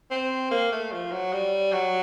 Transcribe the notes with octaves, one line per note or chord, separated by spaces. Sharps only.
C4
A#3
A3
F3
F#3
G3
F#3